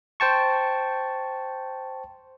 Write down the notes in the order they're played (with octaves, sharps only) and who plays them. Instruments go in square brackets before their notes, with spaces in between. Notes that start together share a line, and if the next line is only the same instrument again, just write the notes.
[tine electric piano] C5 G5 A5 C#6